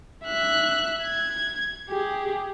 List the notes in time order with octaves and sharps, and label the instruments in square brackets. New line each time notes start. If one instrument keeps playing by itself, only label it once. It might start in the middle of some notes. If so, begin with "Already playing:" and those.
[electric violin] E5 F#6
G#6
G4 G#4